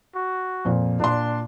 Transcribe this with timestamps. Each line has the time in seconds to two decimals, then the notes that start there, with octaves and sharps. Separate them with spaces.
0.15 F#4
0.65 F2 A#2
1.00 A#2 D4 C6